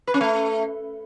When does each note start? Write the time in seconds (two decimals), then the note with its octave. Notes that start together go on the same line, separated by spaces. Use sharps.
0.07 B4
0.14 C#4
0.21 A3